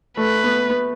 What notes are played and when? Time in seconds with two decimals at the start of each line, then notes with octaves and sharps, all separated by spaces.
0.17 A3 B4
0.44 B3
0.69 B3